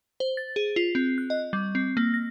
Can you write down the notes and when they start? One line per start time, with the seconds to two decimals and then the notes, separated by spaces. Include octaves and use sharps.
0.20 C5
0.37 A6
0.56 G#4
0.76 F4
0.95 C4
1.18 F#6
1.30 D#5
1.53 G3
1.75 C4
1.97 A#3
2.14 A#6